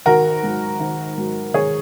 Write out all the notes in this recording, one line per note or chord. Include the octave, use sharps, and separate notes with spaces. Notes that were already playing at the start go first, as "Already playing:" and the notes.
G#1 F#4 A#4
G#2 F#3
G#1
G#2 F#3
G#1 G#4 C#5